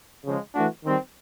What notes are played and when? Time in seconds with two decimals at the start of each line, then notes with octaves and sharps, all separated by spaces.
0.23 C#3 F3 G#3
0.54 E3 A3 D4 F#4
0.83 D#3 G3 C4